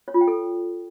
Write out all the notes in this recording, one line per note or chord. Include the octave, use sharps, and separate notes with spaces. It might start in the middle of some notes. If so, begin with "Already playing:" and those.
C#5
F4
G5
A4